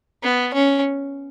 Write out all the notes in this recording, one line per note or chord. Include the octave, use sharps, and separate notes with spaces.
B3
C#4